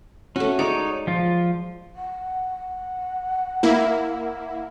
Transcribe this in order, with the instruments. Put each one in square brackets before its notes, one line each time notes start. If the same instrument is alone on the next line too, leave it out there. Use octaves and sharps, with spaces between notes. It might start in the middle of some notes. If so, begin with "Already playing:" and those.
[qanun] A3 F#4 [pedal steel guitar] C#4
[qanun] G#3 D5 D6 [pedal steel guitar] D#4 C#5
[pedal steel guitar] F3 F4
[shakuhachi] F#5
[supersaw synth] A#3 E4